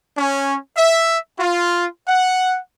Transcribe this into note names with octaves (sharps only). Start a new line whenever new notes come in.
C#4
E5
F4
F#5